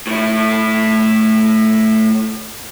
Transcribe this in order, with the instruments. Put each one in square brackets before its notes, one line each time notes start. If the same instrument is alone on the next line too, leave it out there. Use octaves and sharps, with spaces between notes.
[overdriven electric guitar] A2 E4